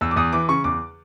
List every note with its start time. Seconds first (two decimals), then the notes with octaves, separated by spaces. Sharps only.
0.01 E2 E6
0.11 D6
0.16 E2 D#6
0.33 E3 D6
0.49 C#3 C#6
0.64 E2 D6